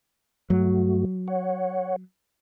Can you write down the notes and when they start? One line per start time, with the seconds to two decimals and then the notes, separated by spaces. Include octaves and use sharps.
0.50 G2 F#3 A3 F#4
1.28 C#5 F#5